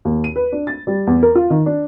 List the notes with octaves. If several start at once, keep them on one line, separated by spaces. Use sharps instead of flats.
D#2
D#7
B4
D4
A6
G3
E2
A#4
F4
D#3
D4